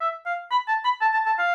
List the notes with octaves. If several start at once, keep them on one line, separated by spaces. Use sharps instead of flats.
E5
F5
B5
A5
B5
A5
A5
A5
F5